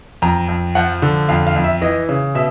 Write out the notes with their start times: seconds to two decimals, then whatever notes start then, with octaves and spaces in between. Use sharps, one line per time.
0.22 F2 A#5
0.49 F2
0.75 F3 F#5
1.02 D3
1.29 F2 F5
1.47 F5
1.56 F2
1.64 E5
1.81 E3 D#5
2.09 C#3
2.35 B2 E5